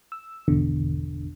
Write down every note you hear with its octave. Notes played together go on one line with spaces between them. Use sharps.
E6
G#1 E2 B2 D3